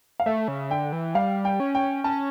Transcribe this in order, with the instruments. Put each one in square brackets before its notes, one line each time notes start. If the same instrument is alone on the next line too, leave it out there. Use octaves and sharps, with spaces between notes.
[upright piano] F5
[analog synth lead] A3 [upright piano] E5
[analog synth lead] C#3
[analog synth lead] D3 [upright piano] G5
[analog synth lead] E3
[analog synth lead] G3 [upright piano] F5
[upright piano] G5
[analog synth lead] C#4
[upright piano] G5
[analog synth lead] C#4 [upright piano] A5